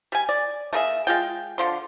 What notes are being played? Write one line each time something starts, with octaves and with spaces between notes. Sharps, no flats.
G3 G#5
D5
A3 A#3 G#4 E5
G#3 F4 G5
D3 F3 C6